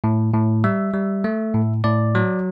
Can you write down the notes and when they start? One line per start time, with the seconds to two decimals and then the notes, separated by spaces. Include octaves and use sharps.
0.04 A2
0.34 A2
0.64 G3 E5
0.94 G3
1.24 A3
1.55 A2
1.84 A2 D5
2.15 F#3